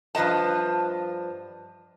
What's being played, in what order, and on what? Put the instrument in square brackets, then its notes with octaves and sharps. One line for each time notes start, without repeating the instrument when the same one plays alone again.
[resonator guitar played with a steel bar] G2 F3 B4 D#5 A5